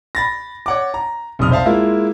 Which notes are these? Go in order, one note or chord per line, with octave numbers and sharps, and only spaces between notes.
B5 A6 A#6
C#5 F#5 D6
A#5
F1 B1 D#6 F6
C5 E5 F5 A5
G#3 A#3 E4 F4